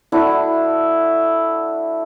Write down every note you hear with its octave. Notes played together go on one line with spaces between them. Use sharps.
A3 D4 E4 F#4